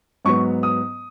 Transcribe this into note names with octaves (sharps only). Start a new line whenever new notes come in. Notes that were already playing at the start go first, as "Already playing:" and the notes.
G#2 F#3 B3 C#6
D#6